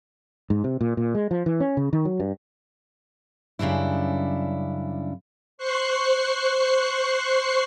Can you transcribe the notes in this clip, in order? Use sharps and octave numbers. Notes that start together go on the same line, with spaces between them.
G#2
C3
A#2
A#2
G#3
F3
E3
C#4
C#3
D#3
F#3
G2
F#2 C#3 G3 D4 E4
C5 C#6 F#6 C7